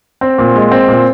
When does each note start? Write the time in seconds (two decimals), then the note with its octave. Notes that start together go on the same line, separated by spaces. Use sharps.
0.21 C4
0.38 A#2
0.56 G#3
0.72 C4
0.88 A#2